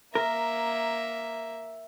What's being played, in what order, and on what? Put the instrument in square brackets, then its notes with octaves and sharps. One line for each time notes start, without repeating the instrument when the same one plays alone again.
[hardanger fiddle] A#3 E5 [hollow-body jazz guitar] A#4